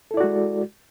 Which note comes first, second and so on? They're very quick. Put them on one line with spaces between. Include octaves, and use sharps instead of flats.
A4 E4 D5 F#4 G#3